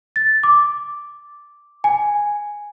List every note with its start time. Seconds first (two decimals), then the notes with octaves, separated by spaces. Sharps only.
0.16 A6
0.43 D6
1.84 G#5